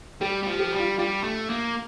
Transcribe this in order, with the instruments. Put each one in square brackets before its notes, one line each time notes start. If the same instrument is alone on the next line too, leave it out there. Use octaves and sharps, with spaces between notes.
[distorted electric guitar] G3 [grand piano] G4
[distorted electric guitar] G3
F3
[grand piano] G4
[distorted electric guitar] G3
[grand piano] F4
[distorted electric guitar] G3 [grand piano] F4
[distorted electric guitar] A3
A#3